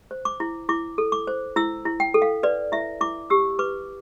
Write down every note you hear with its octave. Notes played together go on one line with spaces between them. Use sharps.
C5
D6
E4
E4 D6
A4
D6
C5
E4 E6
E4
G5
A4
F5
B4 D5
E4 E5
E4 D6
G4 E6
B4 D6